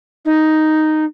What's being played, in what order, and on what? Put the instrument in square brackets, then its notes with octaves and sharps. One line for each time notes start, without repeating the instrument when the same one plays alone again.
[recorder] D#4